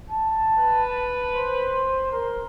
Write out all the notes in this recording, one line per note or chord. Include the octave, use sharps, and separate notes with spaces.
A5
B4
C5
A#4 C6